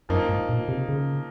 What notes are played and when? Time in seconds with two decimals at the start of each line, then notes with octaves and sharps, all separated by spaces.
0.09 F#2 F3 A#3 D#4
0.29 G#2
0.49 A#2
0.68 C3
0.89 C#3